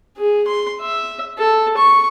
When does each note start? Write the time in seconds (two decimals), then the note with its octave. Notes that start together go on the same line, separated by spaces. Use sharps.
0.17 G#4
0.47 C6
0.81 E5
1.38 A4
1.77 C#6